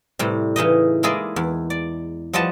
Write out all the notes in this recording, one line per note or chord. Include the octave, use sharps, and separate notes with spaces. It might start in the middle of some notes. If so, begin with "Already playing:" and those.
A2 C3 G3
C#3 E3 D#4 D#5
G#3 A#3 E4 G#4 D5 D#5
E2
D5
F3 G3 D#5 F#5 A5